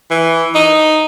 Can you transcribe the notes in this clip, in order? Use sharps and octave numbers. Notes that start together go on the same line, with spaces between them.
E3
D#4